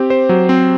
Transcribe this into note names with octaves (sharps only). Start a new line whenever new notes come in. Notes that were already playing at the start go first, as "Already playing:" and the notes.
Already playing: C4 G4
C5
F#3
C4